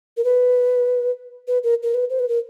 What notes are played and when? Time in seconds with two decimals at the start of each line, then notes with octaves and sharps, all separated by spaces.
0.17 A#4
0.24 B4
1.48 B4
1.64 A#4
1.83 A#4
1.94 B4
2.10 C5
2.19 B4
2.29 A#4